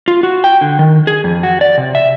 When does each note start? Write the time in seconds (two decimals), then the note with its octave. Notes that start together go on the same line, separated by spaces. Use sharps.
0.08 F4
0.23 F#4
0.44 G5
0.61 D3
0.79 D#3
1.07 G#4
1.24 F2
1.43 F#4
1.61 D5
1.78 C3
1.95 E5